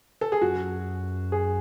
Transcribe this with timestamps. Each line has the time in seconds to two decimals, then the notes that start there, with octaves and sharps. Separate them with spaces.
0.21 A4
0.32 G#4
0.42 F#2 F#4
1.32 G#4